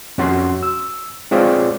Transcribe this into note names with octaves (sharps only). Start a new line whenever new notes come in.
F2 C#4 F#4 C6
E6
G#3 C4 F4 G#4 C#5 D5